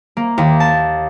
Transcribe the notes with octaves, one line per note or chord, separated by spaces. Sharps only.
A#3
D#2
A5